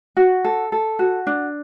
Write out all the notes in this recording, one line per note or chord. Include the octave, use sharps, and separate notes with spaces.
F#4
A4
A4
F#4
D4